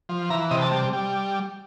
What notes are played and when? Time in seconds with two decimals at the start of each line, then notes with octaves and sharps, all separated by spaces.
0.09 F3
0.30 E3 A#5
0.51 C3 D#5
0.62 A5
0.72 G3
0.93 G3